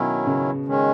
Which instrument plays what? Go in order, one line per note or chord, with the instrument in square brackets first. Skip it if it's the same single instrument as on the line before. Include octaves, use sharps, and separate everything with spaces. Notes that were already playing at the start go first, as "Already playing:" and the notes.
Already playing: [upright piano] B2 [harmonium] D#3 F#3 C#4 E4
[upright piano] C#3
[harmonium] D#3 G#3 C#4